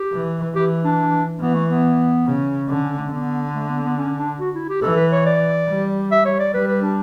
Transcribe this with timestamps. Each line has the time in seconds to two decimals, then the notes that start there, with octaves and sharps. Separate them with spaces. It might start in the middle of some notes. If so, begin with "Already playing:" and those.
Already playing: G4
0.12 E3
0.55 E3 G4
0.84 D4
1.41 E3 B3
1.54 A3
1.69 B3
2.26 C#3
2.69 D3 C#4
2.83 C#4
2.98 A3
3.07 C#4
3.11 D3 B3
3.55 A3
3.69 B3
3.83 B3
3.97 C#4
4.18 D4
4.40 F#4
4.55 E4
4.69 G4
4.82 E3 A4
4.96 B4
5.11 C#5
5.26 D5
5.68 G3
6.12 E5
6.25 C#5
6.40 D5
6.54 G3 B4
6.68 B4
6.82 D4